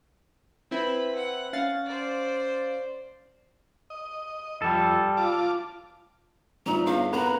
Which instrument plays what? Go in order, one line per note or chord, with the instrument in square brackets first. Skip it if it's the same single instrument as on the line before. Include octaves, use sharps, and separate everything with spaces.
[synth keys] C4 E4 [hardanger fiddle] B4 B5
[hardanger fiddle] F#5
[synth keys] C#4 F5 A6
[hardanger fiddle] C5 D5
[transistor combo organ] D#5
[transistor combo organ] F2 [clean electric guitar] G3 A4
[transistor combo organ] F4 A5 D6
[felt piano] G1 [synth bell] D#4 F4 [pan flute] A#5
[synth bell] B3 D4 E4 [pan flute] F5
[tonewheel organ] B3 A#4 F#5 [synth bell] C4 [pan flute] A#5 [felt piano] B5